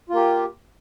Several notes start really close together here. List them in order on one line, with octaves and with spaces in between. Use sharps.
F4 A#3 G4